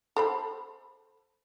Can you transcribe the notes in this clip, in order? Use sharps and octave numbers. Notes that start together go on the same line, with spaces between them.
A4 C5 B5